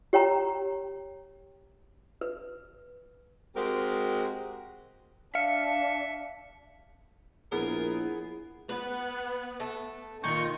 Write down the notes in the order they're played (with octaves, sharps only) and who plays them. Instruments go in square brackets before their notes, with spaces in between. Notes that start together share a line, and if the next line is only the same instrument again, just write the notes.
[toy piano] G4 C#5 G5 A#5
B4
[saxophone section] G#3 C4 F#4 G4 A#4
[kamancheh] D4 [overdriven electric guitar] E5 [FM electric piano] F5 C#7
[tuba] A#1 [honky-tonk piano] B3 G#4 [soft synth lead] E4 [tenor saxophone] A#4
[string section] B3 [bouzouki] B4
[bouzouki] A3 A4
[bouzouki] A#2 F4 [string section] D#3 D#4 [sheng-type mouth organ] C#6 G6